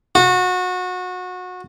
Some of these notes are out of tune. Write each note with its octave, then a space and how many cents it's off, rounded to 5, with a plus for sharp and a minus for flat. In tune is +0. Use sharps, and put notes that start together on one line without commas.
F#4 -25